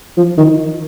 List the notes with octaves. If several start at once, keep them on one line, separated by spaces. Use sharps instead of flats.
F3
D#3